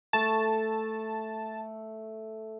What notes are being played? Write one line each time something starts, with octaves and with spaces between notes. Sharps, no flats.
A3 A5